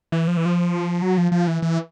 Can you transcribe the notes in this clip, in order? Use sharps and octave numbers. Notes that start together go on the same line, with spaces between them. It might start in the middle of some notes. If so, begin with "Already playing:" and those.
E3
F3
E3
F3
F#3
F3
F3
E3
E3